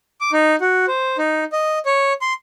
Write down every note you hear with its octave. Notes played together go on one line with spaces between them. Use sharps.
D6
D#4
F#4
C5
D#4
D#5
C#5
C6